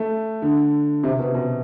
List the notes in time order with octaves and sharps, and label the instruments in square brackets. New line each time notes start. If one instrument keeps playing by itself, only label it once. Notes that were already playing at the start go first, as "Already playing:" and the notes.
Already playing: [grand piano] A3
D3
C3
B2
B2